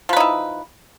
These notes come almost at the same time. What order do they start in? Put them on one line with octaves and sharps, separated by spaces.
F3 B4 D#4 E4